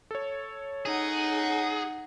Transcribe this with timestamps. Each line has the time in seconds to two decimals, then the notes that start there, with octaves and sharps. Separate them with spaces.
0.11 A4 C#5
0.85 D#4 G#4 F#5